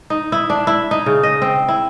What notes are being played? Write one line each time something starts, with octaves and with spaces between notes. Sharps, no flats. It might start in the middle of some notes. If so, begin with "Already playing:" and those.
D#4
E4
D4
E4
D#4
C#3
D#5
C4
E4